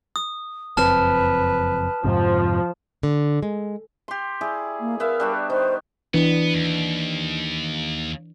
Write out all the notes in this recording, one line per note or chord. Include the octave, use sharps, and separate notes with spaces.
D#6
F#1 F2 C4 B4 A5 F6 E7
F2 G#2 C3 F3
D3
G#3
G4 C6
E4 G#4 D5
A#3
B3 A#4 E5 F5
G3 D4 F#4
D#3 C5
E3 B3 D4
D#2